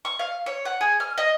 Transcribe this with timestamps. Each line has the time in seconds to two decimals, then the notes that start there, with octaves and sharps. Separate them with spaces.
0.05 C#6
0.19 F5
0.46 C#5
0.65 F#5
0.81 G#4
1.00 F6
1.18 D#5